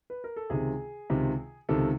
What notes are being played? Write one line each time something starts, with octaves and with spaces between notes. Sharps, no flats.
B4
A#4
A4
C#2 C3 D#3 G#4
C#2 C3 D#3
C#2 C3 D#3 A4